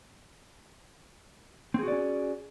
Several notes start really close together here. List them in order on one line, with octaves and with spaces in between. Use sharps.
C4 G#4 F#4 D5 C#4